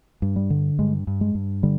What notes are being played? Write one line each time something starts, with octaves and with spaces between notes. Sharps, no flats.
G2
G3
D3
G2 G#3
G2
G#3
G2
D3 G3